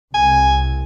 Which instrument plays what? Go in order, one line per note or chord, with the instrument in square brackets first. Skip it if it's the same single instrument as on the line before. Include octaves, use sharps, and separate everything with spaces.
[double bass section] C2 [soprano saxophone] G#5